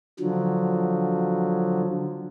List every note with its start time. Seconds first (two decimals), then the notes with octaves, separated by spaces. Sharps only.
0.20 D3 F3 F#3